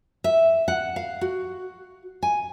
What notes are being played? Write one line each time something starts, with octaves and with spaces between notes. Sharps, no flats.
E5
F#5
F5
F#4
G#5